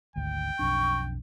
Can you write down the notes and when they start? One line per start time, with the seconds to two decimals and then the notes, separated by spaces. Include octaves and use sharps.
0.16 G#1 D2 G5
0.59 B1 F2 D4 C#6